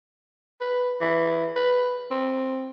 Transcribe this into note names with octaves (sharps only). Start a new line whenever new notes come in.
B4
E3
B4
C4